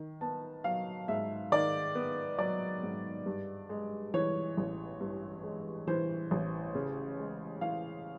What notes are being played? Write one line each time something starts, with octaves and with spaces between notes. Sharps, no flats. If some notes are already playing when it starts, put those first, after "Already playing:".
Already playing: D#3
B3 A5
F#3 F5
G#2 E5
D#3 D5
B3
F#3 D5
G#2
G2
G#3
E3 C#5
A1
G2
G#3
E3 C5
A1
C#3
G#3
E3 F5